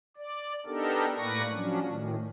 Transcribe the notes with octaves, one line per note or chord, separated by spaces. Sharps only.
D5
B3 D4 D#4 G4 A4 A#4
A2 A#3 B4 D5 C#6 A#6
F3 F#3 C#4 D4
A2 D#3